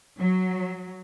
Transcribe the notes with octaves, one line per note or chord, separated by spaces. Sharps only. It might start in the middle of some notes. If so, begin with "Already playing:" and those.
F#3